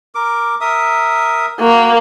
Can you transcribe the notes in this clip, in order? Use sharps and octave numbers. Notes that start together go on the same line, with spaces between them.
A#4 D6
A#4 E5 D#6
A#3 F#4